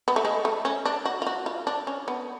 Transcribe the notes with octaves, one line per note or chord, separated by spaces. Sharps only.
B3
A3
G#3
A3
C#4
D4
F#4
F4
F#4
F4
D4
C#4
B3